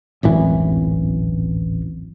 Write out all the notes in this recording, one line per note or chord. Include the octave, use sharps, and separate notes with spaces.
D1 G#1 F#2 E3